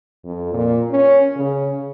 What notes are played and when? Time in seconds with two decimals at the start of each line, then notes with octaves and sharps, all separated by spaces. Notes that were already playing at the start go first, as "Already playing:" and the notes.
0.25 F2
0.54 A#2
0.91 C#4
1.36 C#3